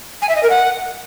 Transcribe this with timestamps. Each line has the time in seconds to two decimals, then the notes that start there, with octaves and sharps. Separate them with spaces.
0.22 G#5
0.29 E5
0.36 D#5
0.43 A#4
0.50 F#5